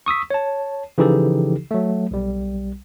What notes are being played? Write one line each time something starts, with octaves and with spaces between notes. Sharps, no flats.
C#6 D#6 E6 B6
C#5 A5
C#3 E3 F3 D#4 G4 A4
F#3 A3
B1 G3